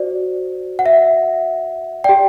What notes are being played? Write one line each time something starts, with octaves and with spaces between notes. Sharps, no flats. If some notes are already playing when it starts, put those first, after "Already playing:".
Already playing: F#4 C5 D5
F#5
E5
G4 D5 G5